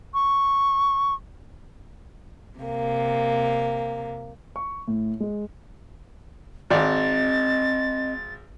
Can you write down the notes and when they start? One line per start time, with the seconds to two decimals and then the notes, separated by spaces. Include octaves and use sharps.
0.14 C#6
2.59 C3 A#3
4.56 C#6
4.88 A2
5.20 G#3
6.70 G#1 C4 D5 D#5 A6